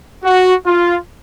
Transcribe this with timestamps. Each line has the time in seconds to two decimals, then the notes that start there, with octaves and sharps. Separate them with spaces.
0.24 F#4
0.66 F4